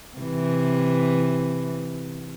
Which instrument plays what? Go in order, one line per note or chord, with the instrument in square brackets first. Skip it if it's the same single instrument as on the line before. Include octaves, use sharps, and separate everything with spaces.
[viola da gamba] C3 E3